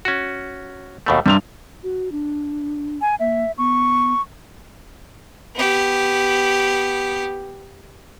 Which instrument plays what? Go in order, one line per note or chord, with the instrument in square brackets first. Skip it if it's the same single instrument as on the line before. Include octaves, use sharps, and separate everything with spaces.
[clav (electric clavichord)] C#4 F#4
D#2 B2 A3
[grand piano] G2 F7 [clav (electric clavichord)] C3 G3
[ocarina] F#4
D4
[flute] G#5
[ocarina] A#3 [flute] E5
[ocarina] B3 [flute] C#6
[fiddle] B3 G4